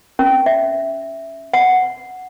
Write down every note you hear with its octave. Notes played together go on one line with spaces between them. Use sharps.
C#4
E5
F#5